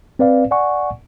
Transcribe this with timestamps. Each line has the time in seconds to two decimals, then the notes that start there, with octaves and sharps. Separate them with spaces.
0.19 C4 B4 D5 F5
0.51 D5 F#5 G#5 C#6